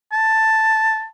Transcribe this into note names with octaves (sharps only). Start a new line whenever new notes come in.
A5